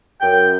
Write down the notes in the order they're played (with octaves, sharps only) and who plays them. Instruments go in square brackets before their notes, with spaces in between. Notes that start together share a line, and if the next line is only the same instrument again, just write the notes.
[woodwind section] F#2 G5